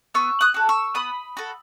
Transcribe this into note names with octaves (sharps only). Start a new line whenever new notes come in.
B3 C#6 E6
D#6 F#6
F#4 A4
C#6 E6
B3 B5 D#6
F#4 A4